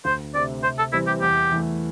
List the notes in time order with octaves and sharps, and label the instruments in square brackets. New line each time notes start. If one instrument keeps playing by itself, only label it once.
[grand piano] D2 [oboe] C5
[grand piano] C3 A3 C4 [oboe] D5
[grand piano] C3 [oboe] C5
[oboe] A4
[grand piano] E3 G3 C4 [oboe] E4
[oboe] G4
[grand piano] E2 [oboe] G4
[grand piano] E3 A3